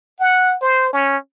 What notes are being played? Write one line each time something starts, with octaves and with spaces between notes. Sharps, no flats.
F#5
C5
C#4